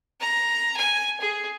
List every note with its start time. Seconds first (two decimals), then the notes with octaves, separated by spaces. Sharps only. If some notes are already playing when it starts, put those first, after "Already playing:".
0.20 A#5
0.77 G#5
1.20 G#4